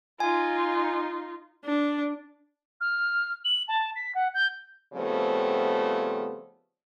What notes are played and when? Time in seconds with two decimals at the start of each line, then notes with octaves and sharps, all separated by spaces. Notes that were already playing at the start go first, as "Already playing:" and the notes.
0.20 D#4 F4 G#5
1.65 D4
2.80 F6
3.44 F#7
3.67 A5
3.95 B6
4.14 F#5
4.34 G6
4.93 C#3 F3 G3 A3 B3 C4